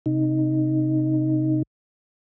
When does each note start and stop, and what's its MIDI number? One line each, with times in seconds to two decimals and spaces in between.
0.06 1.62 48
0.06 1.62 63